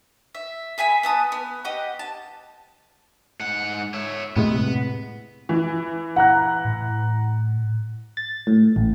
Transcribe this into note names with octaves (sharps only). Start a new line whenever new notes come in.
E5
G#4 E5 G#5 B5
B3 A5 D#6
B3
G4 D#5 F#5
A5
G#2 F#5
C#5 E5
A2 C3 G#3 B3
E3
F#5 A#5 F#6
A2
A6
A2
A1